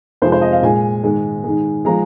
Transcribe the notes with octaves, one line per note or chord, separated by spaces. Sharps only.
F2 C3 F3 G#3 C5
C5
D#5
F5
A#2 G#3 G#5
G#2 D#3 G#3
G#2 D#3 G#3
F3 G#3 A#5